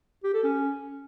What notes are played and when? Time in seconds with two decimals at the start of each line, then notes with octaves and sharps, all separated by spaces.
0.24 G4
0.34 A4
0.44 C#4